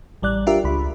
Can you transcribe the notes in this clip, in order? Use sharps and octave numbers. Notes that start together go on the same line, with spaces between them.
A1 G3 D5 F#6
D4 F4 G4 A#4 E5
C#2 B5